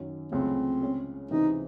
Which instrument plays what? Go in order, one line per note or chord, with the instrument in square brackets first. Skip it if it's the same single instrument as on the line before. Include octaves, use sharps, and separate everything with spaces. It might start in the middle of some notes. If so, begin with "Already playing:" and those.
Already playing: [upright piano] F#2 D#3 F#3 C#4
[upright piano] C#2 C3 F#3 A3 [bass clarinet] C4
[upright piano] C#3 G#3 C#4
[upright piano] C#2 C3 E3 C4 [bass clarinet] D#4